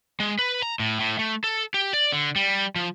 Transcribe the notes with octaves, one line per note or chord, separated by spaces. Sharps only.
G#3
B4
A#5
A2
A2
A3
A4
G4
D5
D3
G3
F3